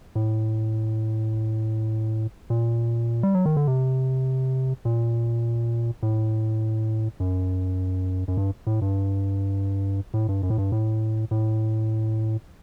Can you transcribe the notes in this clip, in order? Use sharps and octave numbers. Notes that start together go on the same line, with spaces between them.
A2
A#2
G3
F#3
D#3
D3
C3
A#2
A2
F#2
F#2
G2
A2
G2
A2
G2
F#2
A2
G2
A2
A2